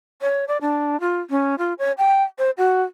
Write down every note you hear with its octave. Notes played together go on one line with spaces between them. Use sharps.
C#5
D5
D4
F4
C#4
F4
C#5
G5
C5
F#4